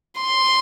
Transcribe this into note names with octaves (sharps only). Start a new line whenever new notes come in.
C6